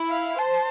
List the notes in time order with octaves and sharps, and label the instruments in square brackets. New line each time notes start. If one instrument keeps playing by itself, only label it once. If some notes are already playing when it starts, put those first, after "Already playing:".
Already playing: [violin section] E4
[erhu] F5
[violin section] C5 [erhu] A5